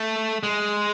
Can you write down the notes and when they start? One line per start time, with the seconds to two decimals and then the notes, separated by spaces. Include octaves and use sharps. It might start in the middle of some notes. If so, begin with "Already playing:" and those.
Already playing: A3
0.43 G#3